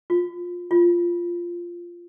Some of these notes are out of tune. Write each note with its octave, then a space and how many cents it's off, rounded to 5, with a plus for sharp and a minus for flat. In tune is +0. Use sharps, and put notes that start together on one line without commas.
F4 +15
F4 -5